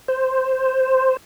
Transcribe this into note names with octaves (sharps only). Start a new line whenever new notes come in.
C5